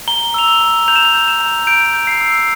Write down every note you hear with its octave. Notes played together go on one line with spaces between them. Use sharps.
A#5 G7
E6 F7
G7
A#5
G6 F7
E7
F7
G6
E7
A#5
G6 D7
G6
C7
E6